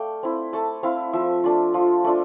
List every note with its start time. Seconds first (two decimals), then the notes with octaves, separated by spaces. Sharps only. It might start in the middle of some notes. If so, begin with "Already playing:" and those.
Already playing: A3 D5 F5 G5
0.23 C4 E4
0.53 A3 A5
0.83 C4 E4 F5
1.13 F3 E5
1.44 A3 D4 F4
1.74 F3
2.04 A3 D4 F4